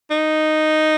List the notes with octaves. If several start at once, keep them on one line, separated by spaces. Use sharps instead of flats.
D#4